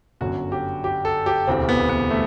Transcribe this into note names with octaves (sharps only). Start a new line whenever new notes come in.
G1 F#2 D3 F#3 F#4
G4
G4
A4
G4
E1 D2 C3 E3 C4
B3
B3
A3